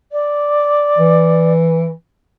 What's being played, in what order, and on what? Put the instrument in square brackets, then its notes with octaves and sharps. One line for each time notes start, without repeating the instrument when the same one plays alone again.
[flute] D5
[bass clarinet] E3